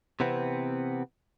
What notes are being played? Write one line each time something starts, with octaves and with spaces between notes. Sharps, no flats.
C3 E3 B3 C4